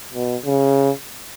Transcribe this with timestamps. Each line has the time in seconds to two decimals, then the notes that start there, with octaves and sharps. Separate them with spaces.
0.14 B2
0.45 C#3